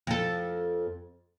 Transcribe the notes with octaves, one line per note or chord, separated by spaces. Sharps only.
F2 A4